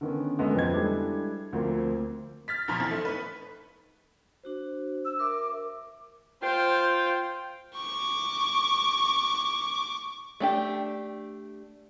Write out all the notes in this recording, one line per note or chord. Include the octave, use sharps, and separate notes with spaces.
D3 D#3 B3 C#4
D2 G#3 A3 B3 C#4
F2 F3 B3 D#5 G#6
G3 G#3 D4 E4 A4
D2 F3 A#3 C4
F6 A6 B6
D2 B2 F3 A#5 C6
E3 F3 C4
A3 D#4
B4
D4 F#4 C5
E6
A#4 E5 D6
F4 C5 G5
C#6 D6
A3 D4 G4